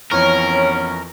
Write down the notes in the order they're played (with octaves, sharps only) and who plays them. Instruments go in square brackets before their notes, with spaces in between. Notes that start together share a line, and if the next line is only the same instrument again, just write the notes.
[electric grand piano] F2 E3 C#6 [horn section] B3 C#4 [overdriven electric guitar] A#4 [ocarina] C#5